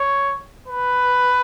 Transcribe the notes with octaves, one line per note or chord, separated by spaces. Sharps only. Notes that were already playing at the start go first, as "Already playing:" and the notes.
Already playing: C#5
B4